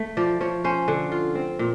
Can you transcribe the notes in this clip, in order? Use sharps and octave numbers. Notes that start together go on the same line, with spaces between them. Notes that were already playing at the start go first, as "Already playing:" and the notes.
Already playing: A3
F3 D5
F3 C#5
C#4 C5
D3
F4
C4
A#2